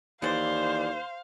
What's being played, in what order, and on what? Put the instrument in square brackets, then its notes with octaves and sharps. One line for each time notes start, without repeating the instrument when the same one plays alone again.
[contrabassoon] D#2 [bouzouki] E3 D5 [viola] C5 [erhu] F5